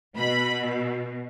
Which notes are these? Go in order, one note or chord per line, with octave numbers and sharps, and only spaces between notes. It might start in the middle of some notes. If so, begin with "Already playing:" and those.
B2 B5